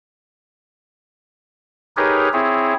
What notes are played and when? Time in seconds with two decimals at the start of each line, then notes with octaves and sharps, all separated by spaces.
1.97 D#4 G4 G#4 A#4 B4 C#5
2.33 C4 E4 G#4 C#5